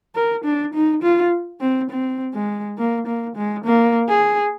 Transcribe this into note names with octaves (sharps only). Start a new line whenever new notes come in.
A#4
D4
D#4
F4
C4
C4
G#3
A#3
A#3
G#3
A#3
G#4